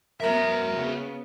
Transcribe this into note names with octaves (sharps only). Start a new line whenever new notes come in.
F#2 B3 F#4 A#4 E5
C#3 B3